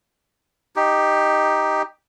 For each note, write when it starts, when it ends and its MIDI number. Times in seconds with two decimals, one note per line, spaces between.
0.76 1.82 63
0.76 1.82 67